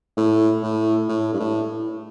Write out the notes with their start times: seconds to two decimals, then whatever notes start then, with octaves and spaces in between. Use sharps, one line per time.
0.17 A2
0.63 A2
1.09 A2
1.33 G2
1.40 A2